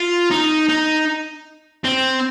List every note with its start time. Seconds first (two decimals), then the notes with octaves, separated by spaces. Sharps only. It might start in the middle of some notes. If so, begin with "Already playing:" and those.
Already playing: F4
0.31 D#4
0.69 D#4
1.84 C4